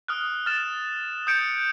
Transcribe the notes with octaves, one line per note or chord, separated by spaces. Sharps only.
D#6 F6 F#6
F6 A6 E7
D#6 F#6 G6 C#7 D7